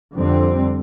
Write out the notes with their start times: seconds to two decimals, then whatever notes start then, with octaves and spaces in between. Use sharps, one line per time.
0.14 F2 D3 G3 C4